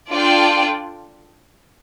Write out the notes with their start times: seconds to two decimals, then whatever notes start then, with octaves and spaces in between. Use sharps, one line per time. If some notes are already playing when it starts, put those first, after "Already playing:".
0.11 D4 F4 A4 D5 G5